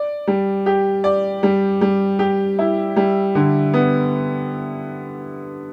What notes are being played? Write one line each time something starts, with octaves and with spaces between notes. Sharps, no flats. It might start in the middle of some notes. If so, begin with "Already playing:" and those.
Already playing: D5
G3
G4
D5
G3
G3
G4
E4
G3
D3
B3